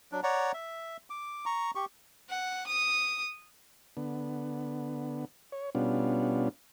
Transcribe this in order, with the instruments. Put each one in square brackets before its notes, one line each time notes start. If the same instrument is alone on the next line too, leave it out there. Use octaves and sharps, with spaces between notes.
[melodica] F#3 D4
C#5 D5 F#5 A#5
E5
D6
A#5 C#6
G4 C#6
[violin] F#5
D#6
[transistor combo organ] D3 B3
C#5
B2 G3 B3 C#4 D4 F4